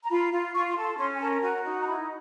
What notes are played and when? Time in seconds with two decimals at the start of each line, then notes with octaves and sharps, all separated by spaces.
0.04 A#5
0.10 F4 B5
0.32 F4
0.54 F4 C#6
0.69 C6
0.77 A4
0.83 C6
0.98 C#4 C6
1.16 G#5
1.20 A#4 A5
1.42 F#4 G#5
1.64 D#4
1.80 A#5
1.87 E4 B5